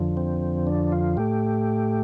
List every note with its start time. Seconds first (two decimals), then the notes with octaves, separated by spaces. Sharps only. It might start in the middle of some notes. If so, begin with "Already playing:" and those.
Already playing: F2 D3 F3
0.17 C4
0.67 D4
0.92 F4
1.17 A2 A3 G4